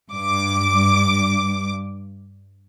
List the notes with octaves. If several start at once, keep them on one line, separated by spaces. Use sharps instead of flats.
G2 D6